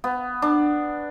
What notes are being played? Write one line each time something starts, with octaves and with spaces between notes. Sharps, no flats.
B3
D4